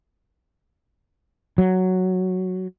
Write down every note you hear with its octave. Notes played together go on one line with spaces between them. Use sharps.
F#3